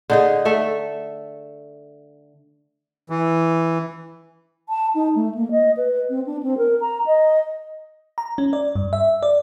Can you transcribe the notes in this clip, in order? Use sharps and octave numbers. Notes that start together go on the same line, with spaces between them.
D3 D#4 G#4
A3 A4 E5
E3
A5
D#4
A3
A#3
D#5
B4
C4
D4
C4
A#4
A#5
D#5
A#5
C#4
D5
G2
E5
D5